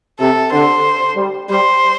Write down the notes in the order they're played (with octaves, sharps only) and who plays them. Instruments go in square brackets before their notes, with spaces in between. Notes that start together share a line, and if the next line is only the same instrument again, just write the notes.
[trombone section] C3 [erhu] A4
[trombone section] D3 [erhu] C5
[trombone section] G3
[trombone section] G3 [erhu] C5